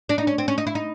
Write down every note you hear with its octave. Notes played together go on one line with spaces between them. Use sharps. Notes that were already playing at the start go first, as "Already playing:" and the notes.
D4
D#4
C#4
C4
C#4
D#4
E4
D#4